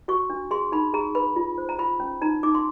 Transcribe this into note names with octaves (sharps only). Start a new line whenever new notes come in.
F#4 C#6
D4
G#4 C6
D#4 B5
G#4 A#5
B4 B5
F4
C5
A#5
F4 B5
C#4
D#4 A#5
D#4 D6
C6